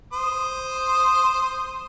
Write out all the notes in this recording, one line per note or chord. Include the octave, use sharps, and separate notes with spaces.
C5 D#6